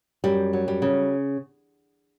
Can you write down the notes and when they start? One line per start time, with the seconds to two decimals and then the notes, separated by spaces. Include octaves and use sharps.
0.24 F#2 G3
0.53 F#3
0.68 G3
0.82 C#3